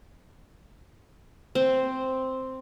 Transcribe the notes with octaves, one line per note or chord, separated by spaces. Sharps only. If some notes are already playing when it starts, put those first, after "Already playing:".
C4